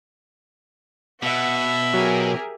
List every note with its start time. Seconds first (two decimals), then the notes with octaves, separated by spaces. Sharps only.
1.23 B2 E5 F#5
1.94 F#3 G4 G#4 A#4